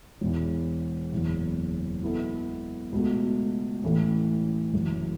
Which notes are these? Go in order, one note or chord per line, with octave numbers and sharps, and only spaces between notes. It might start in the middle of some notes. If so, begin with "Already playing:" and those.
E1 E2 E3
F#1 E2 E3
B2 B3 E4 A4
C#2 B2 A3 F#4
A1 A2 E3 A3 C#4
F#1 F#2 E3